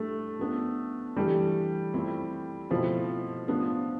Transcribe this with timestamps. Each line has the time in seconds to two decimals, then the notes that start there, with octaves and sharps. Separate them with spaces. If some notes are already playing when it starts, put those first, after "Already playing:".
Already playing: A2 G3 A3 D4
0.39 F3 B3 D4
1.16 E3 G3 A3 D4
1.94 F3 A3 C4 E4
2.70 B2 F3 A3 C4 E4
3.48 A2 F3 B3 D4